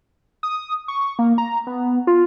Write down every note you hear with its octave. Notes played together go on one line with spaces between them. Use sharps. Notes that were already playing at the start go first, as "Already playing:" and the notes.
D#6
C#6
A#3
A#5
B3
F4